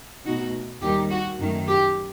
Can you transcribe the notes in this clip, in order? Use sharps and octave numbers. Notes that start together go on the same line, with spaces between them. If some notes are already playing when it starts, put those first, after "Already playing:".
B2 A3 D#4 F#4
D#2 D#3 G3 D#4 G4
F#4
F#2 D#3 A3
G4